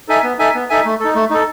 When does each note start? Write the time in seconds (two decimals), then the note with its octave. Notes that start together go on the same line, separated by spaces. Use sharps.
0.08 D#4 A4 E5 G#5
0.23 B3
0.39 D#4 A4 E5 G#5
0.54 B3
0.70 D#4 A4 E5 G#5
0.85 A3
1.00 D#4 A4
1.15 A3
1.30 D#4 A4